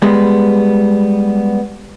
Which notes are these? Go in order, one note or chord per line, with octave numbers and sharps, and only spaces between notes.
G3 G#3 B3